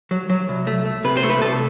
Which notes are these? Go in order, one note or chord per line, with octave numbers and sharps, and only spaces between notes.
F#3
F#3
C2
A3
A3
C3 B4
C5
A3
B4
C2 A4